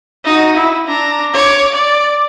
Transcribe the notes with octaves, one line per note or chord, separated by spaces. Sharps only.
D#4 F#4
E4
D4 A#5
C#5 D6
D5